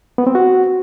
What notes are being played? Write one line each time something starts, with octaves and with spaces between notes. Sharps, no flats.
B3
C4
F#4